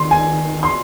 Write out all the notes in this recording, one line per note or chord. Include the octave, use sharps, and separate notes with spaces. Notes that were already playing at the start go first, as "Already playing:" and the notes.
Already playing: D#3 C6
G#5
C6